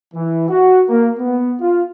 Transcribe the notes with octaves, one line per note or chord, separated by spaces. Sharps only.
E3
F#4
A#3
B3
F4